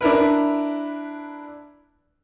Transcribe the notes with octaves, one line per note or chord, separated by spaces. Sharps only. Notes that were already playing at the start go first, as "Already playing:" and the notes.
D4 E4 A#4 B4